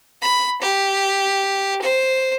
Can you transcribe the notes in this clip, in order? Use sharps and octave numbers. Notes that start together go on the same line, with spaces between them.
B5
G4
C5